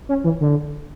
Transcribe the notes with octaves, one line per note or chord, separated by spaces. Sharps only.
C#4
E3
D3